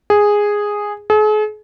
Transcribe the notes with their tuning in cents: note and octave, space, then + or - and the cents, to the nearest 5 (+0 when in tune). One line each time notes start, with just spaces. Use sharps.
G#4 -5
G#4 +45